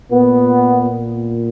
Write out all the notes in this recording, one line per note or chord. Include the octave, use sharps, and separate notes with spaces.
A#2 B3